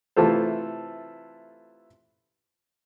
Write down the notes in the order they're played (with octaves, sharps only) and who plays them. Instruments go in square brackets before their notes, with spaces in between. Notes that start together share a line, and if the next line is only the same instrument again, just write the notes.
[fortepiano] C3 E3 A3 F4 A4 C5